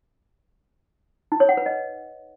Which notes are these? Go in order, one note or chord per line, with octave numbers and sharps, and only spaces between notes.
D#4
C#5
F#5
B4
D#5